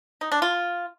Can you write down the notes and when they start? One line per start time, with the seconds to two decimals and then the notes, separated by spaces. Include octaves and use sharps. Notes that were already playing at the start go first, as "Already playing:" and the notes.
0.21 D#4
0.32 D4
0.42 F4